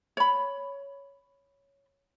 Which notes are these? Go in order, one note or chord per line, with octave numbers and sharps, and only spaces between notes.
C#5 B5